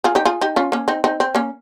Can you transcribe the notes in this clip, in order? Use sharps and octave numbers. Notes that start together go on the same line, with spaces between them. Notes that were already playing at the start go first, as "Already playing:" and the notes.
F4 G#4
D#4 G4
F4 G#4
D#4 G4
C#4 F4
A#3 C#4
C4 D#4
C4 D#4
C4
A#3 C#4